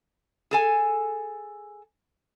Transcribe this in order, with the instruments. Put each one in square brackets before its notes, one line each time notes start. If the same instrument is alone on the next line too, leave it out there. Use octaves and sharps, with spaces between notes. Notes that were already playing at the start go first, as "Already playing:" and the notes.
[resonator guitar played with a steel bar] G#4 A4 G#5